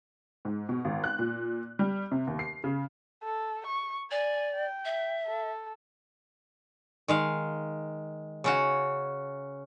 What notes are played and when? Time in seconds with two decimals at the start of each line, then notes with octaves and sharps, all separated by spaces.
0.45 G#2
0.69 B2
0.85 G#1
1.04 F#6
1.19 A#2
1.79 G3
2.11 C3
2.27 D#2
2.39 C7
2.64 C#3
3.23 A4
3.66 C#6
4.11 D5 G#5
4.55 G5
4.85 E5
5.27 A4
7.08 D#3 G#3 F5
8.44 C#3 C#4 F#4